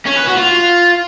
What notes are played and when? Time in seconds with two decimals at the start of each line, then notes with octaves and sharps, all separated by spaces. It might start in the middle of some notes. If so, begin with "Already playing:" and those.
0.06 C#4
0.16 B4
0.26 F#4
0.37 F4